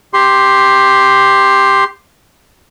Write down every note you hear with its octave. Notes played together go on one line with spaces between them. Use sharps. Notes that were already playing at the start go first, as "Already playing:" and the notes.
G4 C6